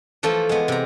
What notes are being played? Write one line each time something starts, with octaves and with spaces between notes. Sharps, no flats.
E3 F3 A3 F4 A4
G#3 B3
C3 A#5